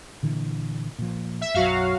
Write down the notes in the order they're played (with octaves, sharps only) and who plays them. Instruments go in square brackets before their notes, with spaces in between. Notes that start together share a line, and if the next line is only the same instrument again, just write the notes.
[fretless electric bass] A#2 D3 E3
A#2 F3
[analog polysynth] E5
[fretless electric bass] B1 F#2 [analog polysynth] F#3 F#4 F5